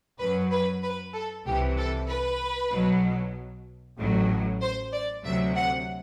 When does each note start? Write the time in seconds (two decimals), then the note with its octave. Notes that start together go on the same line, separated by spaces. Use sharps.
0.20 F#2 F#3 B4
0.51 B4
0.83 B4
1.14 A4
1.46 C2 C3 E3 G4
1.78 A4
2.10 B4
2.72 B1 B2 F#3
3.99 A1 A2 F#3
4.62 C5
4.93 D5
5.24 D2 C3 F#3 E5
5.56 F#5